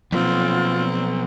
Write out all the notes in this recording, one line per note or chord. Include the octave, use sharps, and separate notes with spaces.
B1 F2 F3 A#3 C4 F4